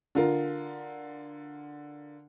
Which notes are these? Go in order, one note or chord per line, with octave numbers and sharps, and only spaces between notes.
D3 F4 A#4